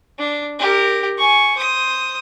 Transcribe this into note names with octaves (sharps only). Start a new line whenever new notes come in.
D4
G4 A#4
G#5 C#6
C5 D#6